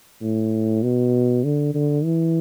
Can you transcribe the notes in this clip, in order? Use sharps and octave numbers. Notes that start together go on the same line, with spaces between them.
A2
B2
D3
D3
E3